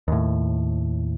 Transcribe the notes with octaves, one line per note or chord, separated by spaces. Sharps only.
D#2 A2